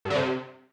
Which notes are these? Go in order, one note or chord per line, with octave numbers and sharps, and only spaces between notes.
G2
D3
C3